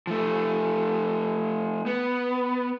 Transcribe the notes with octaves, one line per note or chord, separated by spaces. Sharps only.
F3 A3
B3